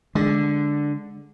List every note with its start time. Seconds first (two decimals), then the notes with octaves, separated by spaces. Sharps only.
0.15 D3 G#3